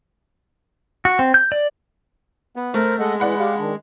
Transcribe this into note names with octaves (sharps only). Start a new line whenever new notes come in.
F#4
C4
G6
D5
B3
A3 A#4 C5
G#3 A4 D#5 F#5
E3 D5 F#5 B5
G4 F5
D#3 D4